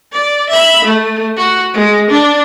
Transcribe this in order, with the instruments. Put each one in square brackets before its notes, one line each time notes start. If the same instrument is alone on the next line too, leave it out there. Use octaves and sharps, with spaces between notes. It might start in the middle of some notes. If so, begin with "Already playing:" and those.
[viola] D5
E5 B5
A3
F#4
G#3
D4